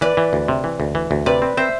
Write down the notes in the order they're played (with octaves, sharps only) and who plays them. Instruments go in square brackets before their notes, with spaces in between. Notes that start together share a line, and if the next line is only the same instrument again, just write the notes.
[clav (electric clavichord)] E3 [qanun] B4 D5
[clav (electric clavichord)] E3
D2
C3
E3
D2
E3
D2
[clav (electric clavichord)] C3 [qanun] B4 D5
[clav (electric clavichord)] C4
[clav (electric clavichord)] C4 [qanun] C5 E5